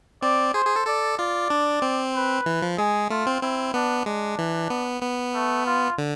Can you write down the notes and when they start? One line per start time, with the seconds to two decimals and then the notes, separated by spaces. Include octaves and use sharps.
0.22 C4 D5
0.54 G#4 C5
0.65 G#4
0.76 A4
0.87 A4 D5
1.18 F4 D5
1.50 D4
1.82 C4
2.15 B4
2.46 E3
2.62 F3
2.78 G#3 G#4
3.10 A3 F4
3.27 C4
3.42 C4 E4
3.74 B3 D4
4.06 G#3 D4
4.39 E3
4.70 B3
5.02 B3
5.34 A3
5.66 F4
5.98 D3